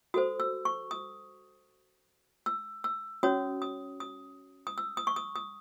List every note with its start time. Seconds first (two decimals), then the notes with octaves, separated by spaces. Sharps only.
0.14 F#4 A4 C5 D#6
0.40 E6
0.65 C#6
0.91 D#6
2.46 E6
2.84 E6
3.23 C#4 F#4 C#5 D#6
3.62 D#6
4.00 D#6
4.67 D#6
4.78 E6
4.97 D#6
5.07 C#6
5.16 D#6
5.36 D#6